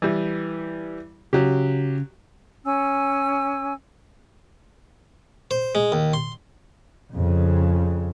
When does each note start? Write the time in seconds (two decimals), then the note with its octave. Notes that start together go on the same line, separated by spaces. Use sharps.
0.02 E3 G3
1.33 C#3 F#3 G4
2.65 C#4 G#5 E6
5.51 C5
5.75 G#3
5.92 D#2
6.13 C6
7.13 F2 C#3